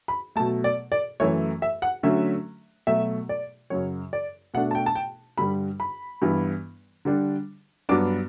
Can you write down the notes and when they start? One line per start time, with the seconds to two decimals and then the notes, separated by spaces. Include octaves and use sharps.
0.08 B5
0.36 B2 F#3 A3 A5
0.64 D5
0.92 D5
1.20 F#2 E3 A3 C#5
1.62 E5
1.82 F#5
2.03 D3 F#3 A3 C#4 E5
2.87 B2 F#3 A3 E5
3.29 D5
3.70 F#2 C#3 F#3 C#5
4.13 D5
4.54 B2 A3 D4 F#5
4.71 A5
4.75 G5
4.86 A5
4.95 G5
5.38 G2 D3 G3 B5
5.80 B5
6.22 G2 E3 B3
7.05 D3 G3 D4
7.89 G2 F#3 B3 D4 D6